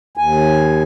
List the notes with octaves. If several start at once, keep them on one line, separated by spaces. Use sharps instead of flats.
D#2 G#5